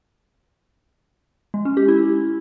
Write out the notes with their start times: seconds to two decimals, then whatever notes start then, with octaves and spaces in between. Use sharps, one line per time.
1.54 G#3
1.65 C#4
1.77 G4
1.88 E4